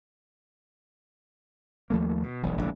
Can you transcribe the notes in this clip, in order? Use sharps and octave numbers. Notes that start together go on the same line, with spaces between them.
D#2 F3 A3 A#3
B2
E1 B1 E2
E1 A#1 A#2 D3